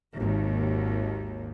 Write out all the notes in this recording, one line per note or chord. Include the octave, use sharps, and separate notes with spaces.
G#1 D#2